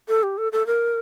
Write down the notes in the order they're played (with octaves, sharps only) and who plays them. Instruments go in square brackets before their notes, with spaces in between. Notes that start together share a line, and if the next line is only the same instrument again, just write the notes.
[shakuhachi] A4
G4
A4
A4
A#4